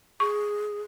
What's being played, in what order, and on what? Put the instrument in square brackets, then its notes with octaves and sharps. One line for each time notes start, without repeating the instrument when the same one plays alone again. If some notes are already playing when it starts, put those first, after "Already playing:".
[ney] G#4 [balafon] C#6